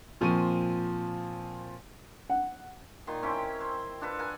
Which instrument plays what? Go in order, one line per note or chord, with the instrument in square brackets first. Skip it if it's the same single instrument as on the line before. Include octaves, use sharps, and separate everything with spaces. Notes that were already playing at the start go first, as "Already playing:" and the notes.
[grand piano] A#2 F3 C4 C#6 D#7
[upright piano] F#5
[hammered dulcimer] A#2 D#3 C6
C4 C#4 E4 G5
C5
D4 F4 A4 B4
A#4 F#5 G#5